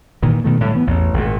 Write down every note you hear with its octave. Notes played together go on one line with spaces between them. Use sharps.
A#2 D#3 E3
B2 D#3 A3
A2 D3 G3
E3 B3
A1 E2
G#1 A#2